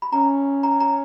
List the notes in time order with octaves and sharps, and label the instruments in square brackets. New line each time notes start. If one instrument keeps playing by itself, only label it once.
[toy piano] B5
[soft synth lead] C#4 [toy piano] A#5
[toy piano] A#5
A#5